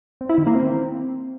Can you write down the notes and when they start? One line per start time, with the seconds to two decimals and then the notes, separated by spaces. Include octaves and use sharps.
0.21 C4
0.29 E4
0.38 D#3
0.47 A#3
0.55 C4